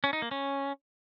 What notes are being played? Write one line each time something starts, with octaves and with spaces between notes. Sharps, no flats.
C#4
D#4
A#3
C#4